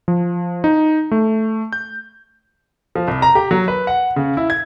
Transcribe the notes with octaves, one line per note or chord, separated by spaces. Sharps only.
F3
D#4
A3
G6
F3
C2
A#5
G4
F#3
B4
F#5
C#3
E4
G#6